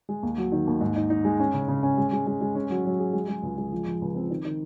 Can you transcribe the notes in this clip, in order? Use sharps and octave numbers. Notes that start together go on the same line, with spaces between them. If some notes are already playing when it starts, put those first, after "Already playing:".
G#3
D#2
F#3
D#3
D#2
G#2
D#4
D#4
G#3
C#4
C#3
C#3
C#4
G#3
G#3
G#3
G#3
C#4
F#3
F#3
G#4
G#3
G#3
C#2
G#3
F3
F3
C#2
C4
D#3
D#3